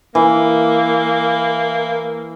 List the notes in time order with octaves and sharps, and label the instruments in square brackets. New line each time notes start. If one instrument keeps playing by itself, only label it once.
[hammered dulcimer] E3 [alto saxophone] A#3